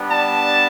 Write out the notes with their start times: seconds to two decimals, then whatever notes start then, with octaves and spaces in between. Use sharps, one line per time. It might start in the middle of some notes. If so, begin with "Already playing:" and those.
Already playing: G3 B3 D4
0.08 A5